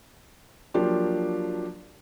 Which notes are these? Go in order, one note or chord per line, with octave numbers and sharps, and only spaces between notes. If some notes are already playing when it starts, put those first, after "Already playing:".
F3 F#3 A#3 D4 F4 G4